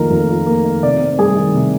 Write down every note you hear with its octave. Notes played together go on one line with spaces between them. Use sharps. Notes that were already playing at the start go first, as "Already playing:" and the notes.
Already playing: F2 D#3 A#3 F4 A#4
F2
F4
A#3
D#3
C3 D5
C4
G3 G#4
D#3
C3